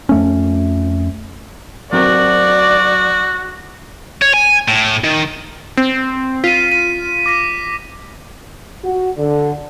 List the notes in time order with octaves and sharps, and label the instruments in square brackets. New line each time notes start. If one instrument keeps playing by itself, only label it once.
[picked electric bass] F2 A3 C#4
[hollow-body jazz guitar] F#3 C4 A#4 [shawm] F#4 [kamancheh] D5
[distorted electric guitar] C#5
G#5
A2
D#3
[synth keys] C4
[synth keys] F4 [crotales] B6 D#7
[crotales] B6 D#7
D6 A#6 B6
[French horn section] F#4
D3